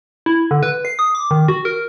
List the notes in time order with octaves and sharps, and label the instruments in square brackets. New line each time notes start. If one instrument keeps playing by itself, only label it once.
[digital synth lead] E4
D3
B4
C7
D#6
D6
D#3
F#4
A#4